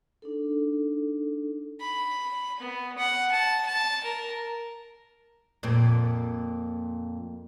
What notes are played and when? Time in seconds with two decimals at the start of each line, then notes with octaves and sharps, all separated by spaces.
0.22 D4 D#4 A4
1.81 B5
2.60 B3
2.98 F#5
3.32 A5
3.66 A5
4.04 A#4
5.63 F2 A#2 C4